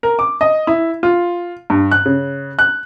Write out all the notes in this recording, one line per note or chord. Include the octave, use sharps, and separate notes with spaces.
A#4
D6
D#5
E4
F4
G2
F#6
C#3
F#6